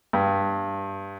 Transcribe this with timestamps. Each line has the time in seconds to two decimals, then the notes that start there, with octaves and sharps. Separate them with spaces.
0.13 G2